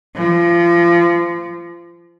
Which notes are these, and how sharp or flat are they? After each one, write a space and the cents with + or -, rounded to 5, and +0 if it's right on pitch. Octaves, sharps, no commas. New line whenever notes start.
F3 -30